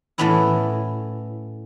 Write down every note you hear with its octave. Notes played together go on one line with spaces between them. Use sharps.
A2 E3 A3 B3 C#4 E4